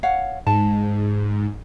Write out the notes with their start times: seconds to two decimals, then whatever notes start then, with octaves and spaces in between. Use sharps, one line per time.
0.03 C#5 F5 F#5
0.47 G#2 A5